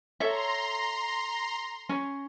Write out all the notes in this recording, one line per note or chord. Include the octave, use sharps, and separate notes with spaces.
A4 C#5 E5 A#5 C6
C#4